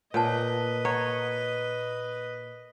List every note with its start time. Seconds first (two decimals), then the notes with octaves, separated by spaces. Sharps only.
0.14 A#2 B4 C#5 D#5 F#5 A5
0.85 C#5 F#5 A#5